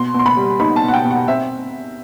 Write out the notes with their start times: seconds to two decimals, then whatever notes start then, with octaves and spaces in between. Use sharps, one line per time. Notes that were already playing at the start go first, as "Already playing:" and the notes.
Already playing: B2 C6
0.14 B2 C6
0.26 B5
0.37 G3
0.60 D#4 B5
0.76 A5
0.82 B2
0.88 F#5
0.94 G5
1.05 B2
1.11 F#5
1.28 C4 E5